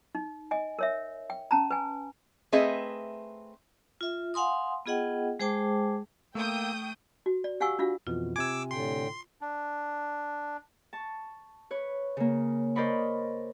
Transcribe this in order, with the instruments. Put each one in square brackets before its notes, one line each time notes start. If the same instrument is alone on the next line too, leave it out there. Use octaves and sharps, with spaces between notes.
[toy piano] D#4
D#5 G#5
A#4 C#5 E5
G5
C#4 A5 A#5
B4 G#5
[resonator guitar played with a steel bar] A3 C4 G#4 B4 D#5 E5
[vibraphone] F4 E5
F5 F#5 G#5 C6 D#6
B3 F4 G#4 D#5 F#5 G5
G#3 G#4 C5 G5 A5 D6
[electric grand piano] A3 [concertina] A#3 E6 [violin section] G5 D#6 G6
[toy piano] F#4
D5
G4 F5 F#5 G#5 C#6 E6
D4 F4 F#4 F5
[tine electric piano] F2 B2 E3 [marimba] F4
[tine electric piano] C3 G#5 [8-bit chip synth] D6 E6 [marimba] G#6
[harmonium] A2 D3 G5 [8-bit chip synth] C6
[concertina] D4
[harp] A5 C#6
B4 C#5
C#3 A#3
A#4 C5 D5 D#5 B5 C#6